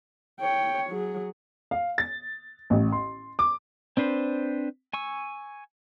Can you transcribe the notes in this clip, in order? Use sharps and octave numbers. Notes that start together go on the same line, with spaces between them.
C#5 G5
F#3 G#4
F5
A6
A1
C6
D6
C4 D4 B4 C5
G#5 C#6 E6